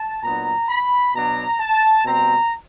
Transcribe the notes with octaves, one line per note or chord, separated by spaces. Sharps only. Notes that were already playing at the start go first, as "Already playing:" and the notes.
Already playing: A5
A#2 F#3 B3 D4 A#5
B5
B2 F#3 B3 D4 A#5
A5
B2 G3 C4 A#5